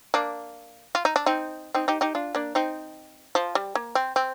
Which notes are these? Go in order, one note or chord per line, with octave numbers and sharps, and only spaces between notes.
A#3 D4
F4
D#4
D4
C4 D#4
C4 D#4
D#4 G4
D#4 G4
D4 F4
A#3 D4
C4 D#4
F3
G3
A#3
C4
C4